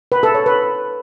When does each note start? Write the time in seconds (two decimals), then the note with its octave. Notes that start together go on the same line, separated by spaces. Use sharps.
0.12 B4
0.23 A4
0.35 C#5
0.46 B4